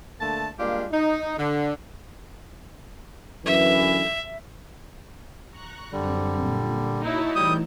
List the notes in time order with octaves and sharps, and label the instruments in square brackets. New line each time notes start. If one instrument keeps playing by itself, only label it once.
[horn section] D3 A3 A#3 A5
G3 G#3 A#3 D4 F4 G4
D#4
D3
[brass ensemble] F#2 D3 E3 [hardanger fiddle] E5
[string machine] A#5 C#6 F#6
[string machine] F#2 C4 [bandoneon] D3 G3
[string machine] A#2
[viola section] D#4 E4 [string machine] F#4 C#5 A5
[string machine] E3 A3 [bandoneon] G3 G6 [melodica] D#6